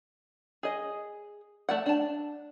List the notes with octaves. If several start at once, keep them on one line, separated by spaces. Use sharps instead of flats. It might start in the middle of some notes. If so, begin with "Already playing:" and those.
G#4 D#5
A3 D5 F#5
D4 A5